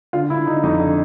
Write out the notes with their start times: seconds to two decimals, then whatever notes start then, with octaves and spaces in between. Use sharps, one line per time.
0.13 D3 F4
0.30 D3 E4
0.47 D3 D#4
0.63 F2 D#4
0.80 D3